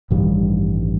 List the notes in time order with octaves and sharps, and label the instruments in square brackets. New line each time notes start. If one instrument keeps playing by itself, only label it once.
[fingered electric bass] A1 G2 D#3 G3